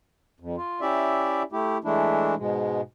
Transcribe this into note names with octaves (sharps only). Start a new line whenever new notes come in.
F2
F4
C#4 E4 G4 D5 E5
A3 E4 G4
E3 G#3 A3 D4 E4
G#2 B2 G#3